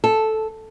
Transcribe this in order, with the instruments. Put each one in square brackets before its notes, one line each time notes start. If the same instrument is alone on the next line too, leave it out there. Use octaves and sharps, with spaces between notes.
[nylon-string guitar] A4